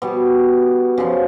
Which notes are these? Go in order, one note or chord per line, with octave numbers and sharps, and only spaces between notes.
B2 G3 B3
F#2 C#3 F3